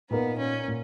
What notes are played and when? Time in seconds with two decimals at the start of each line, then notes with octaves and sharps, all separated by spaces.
0.10 A#2 A#3 B3 D#4 A#4
0.39 C#4
0.68 A#2